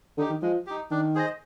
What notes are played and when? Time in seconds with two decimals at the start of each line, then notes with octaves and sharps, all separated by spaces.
0.17 D3 D#4 G4
0.30 D#3
0.42 F3 G#3
0.66 D#4 G4
0.91 D#3 D4
1.15 G#4 C5 D#5